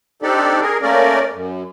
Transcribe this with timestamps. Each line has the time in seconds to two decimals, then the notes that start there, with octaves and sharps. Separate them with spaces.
0.22 C4 D4 D#4 G4 A4 D5
0.62 G#4 A#4
0.82 A3 A#3 C#4 A#4 D5
1.33 F#2